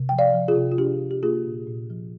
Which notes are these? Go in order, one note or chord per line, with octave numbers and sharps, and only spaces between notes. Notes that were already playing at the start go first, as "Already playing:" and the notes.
Already playing: C3
F3 G5
D5 F5
F3
F4 G#4
C3
F4
D4 G4
F3
G4
A#3 F4 G#4
A#2
A#2
F3